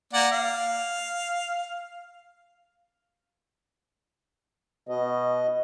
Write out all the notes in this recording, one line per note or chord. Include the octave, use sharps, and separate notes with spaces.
A#3 D5 F#5
F5
B2 D#5